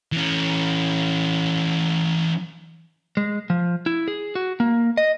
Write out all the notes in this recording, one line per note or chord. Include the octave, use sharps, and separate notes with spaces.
E3 C#4
G#3
F3
E4
G#4
F#4
A#3
D#5